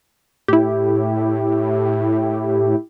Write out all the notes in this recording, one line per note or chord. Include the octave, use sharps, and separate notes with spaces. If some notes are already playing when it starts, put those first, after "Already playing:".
A2 E4 G4